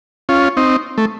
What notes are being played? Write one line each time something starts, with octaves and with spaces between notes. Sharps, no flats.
C#4 F4
C4 D#4
A3